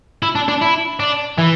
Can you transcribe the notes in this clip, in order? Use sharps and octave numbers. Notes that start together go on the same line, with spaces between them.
E4
D4
D4
E4
D4
E3